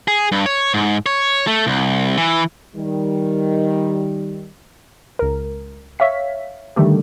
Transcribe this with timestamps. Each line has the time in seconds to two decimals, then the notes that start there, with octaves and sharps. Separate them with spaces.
0.08 G#4
0.32 G2
0.46 C#5
0.74 G#2
1.06 C#5
1.47 A3
1.67 C2
2.17 E3
2.76 D#3 G3
5.19 C#2 A#4
5.99 C#5 E5 F5 B6
6.76 D3 D#3 G3 A3 G4